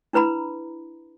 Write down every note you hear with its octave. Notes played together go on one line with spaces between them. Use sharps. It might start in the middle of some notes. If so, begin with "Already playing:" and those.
D4 E4 B4 A#5 B5